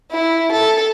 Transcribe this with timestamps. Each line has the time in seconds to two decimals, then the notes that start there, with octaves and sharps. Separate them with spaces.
0.11 E4
0.52 A4